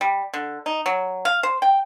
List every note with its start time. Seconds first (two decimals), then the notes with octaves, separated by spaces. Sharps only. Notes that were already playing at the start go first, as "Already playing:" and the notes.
0.01 G3
0.34 D3
0.66 D#4
0.86 F#3
1.25 F5
1.43 C5
1.62 G5